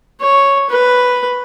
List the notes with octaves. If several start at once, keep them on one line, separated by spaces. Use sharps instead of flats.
C#5
B4